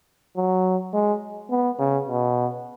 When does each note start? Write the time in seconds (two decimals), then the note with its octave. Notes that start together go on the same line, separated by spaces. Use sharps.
0.37 F#3
0.93 G#3
1.50 B3
1.79 C#3
2.08 B2